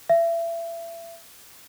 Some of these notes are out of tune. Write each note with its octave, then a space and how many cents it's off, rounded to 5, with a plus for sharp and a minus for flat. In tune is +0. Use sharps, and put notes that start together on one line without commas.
E5 +30